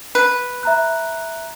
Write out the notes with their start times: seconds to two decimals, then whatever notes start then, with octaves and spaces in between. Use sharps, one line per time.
0.15 B4
0.63 E5 A#5 F#6